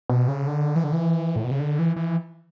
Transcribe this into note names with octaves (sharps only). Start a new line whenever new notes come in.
B2
C#3
D3
E3
D3
E3
A2
B2
C#3
D3
E3
E3